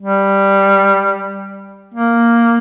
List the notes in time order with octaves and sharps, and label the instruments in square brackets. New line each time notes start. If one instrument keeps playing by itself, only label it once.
[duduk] G3
A#3